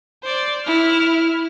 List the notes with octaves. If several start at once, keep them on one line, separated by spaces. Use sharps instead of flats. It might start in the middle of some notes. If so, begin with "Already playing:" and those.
C5 D5
E4 F6